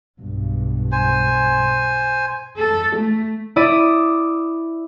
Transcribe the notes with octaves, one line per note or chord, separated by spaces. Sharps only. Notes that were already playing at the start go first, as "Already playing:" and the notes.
B1 G2
C5 G#5
A4
A3
E4 D5 D#6